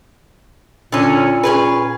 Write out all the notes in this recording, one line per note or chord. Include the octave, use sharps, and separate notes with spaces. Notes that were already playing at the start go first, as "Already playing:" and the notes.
A#2 D3 C#4
C#4 G#4 B4